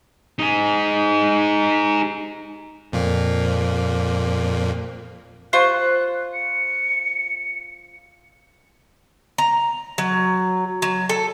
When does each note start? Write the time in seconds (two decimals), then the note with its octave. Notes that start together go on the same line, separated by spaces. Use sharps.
0.39 D#4 G#4
2.92 F2 A#2 A#3
5.53 F4 C5 C#6 F#6
6.34 C#7
9.38 A#5
9.98 F#3
10.82 F#3
11.09 A4